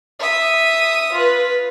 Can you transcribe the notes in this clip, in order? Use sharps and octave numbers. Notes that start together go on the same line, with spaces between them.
E5 D#6
F4 B4